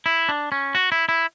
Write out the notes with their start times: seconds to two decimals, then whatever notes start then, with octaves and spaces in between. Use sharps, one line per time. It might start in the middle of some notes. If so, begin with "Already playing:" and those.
0.06 E4
0.29 D4
0.52 C#4
0.75 F#4
0.92 E4
1.09 E4